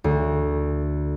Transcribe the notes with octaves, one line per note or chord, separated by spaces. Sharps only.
D2